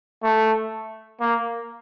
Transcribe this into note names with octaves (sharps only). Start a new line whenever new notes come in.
A3
A#3